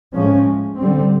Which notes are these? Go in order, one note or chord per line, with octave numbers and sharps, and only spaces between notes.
A2 F3 G#3 C#4
D3 G3 C4